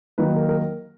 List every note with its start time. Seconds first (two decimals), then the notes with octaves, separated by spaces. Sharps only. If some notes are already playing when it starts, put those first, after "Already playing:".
0.18 D#3 F#3 A#3 D#4 B4
0.36 A#4
0.49 A#4